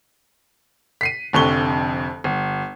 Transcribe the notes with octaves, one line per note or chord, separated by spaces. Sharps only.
B6 C7 D#7
F1 F2 D3 C#6 G7
G1